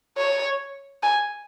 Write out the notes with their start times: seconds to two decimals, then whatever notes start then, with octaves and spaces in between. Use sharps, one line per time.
0.17 C#5
1.03 G#5